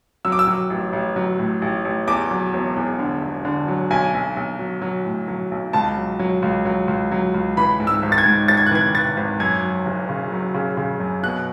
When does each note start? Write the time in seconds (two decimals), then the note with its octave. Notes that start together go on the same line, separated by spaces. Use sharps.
0.25 F#3 E6
0.32 D6
0.39 E6
0.47 F#3
0.70 A1
0.93 A1
1.16 F#3
1.39 A2
1.62 A1
1.85 A1
2.08 E2 D6
2.31 F#3
2.54 E1
2.76 E2
2.99 D3
3.22 E1
3.45 D3
3.68 F#3
3.90 B1 G#5
4.14 B1
4.36 B1
4.59 F#3
4.82 F#3
5.05 A2
5.28 F#3
5.51 B1
5.73 C#2 A5
5.97 F#3
6.19 F#3
6.42 C#2
6.65 F#3
6.88 C#2
7.11 F#3
7.34 C#2
7.57 E3 B5
7.80 G#2
7.87 E6
8.03 G#1
8.12 A6
8.18 G#6
8.26 G#2
8.48 G#1 A6
8.57 G#6
8.67 F#6
8.71 E3 G#6
8.95 E3 A6
9.17 G#1
9.40 F#2 G#6
9.63 F#3
9.86 F#1
10.09 C#3
10.32 F#3
10.54 C#3
10.77 C#3
11.00 F#2
11.23 B2 F#6